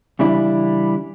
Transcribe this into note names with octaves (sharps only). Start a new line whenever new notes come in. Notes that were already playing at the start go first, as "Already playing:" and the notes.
C#3 E3 G3 D4 E4